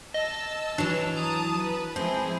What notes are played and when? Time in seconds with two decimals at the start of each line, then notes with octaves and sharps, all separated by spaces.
0.14 D#5 A5 E6
0.78 E3 F#3 D4
1.17 A5 A#5 D#6
1.61 B4
1.96 F3 G#3 C4 E4 G#4